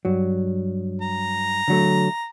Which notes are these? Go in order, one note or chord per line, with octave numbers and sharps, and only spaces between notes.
G2 F#3
A#5
D3 F#3 A3